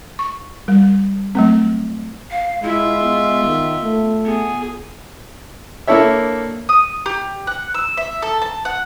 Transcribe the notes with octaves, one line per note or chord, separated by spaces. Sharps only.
C#6
G3
F#3 A3 C4
F5
G#3 E4 F4 E5
B3
D#3
A3
B3 G#4
A#3 D4 E4 A4 C#5 E5
D#6
G4
F#5
E6
E5
A4
A5
F#5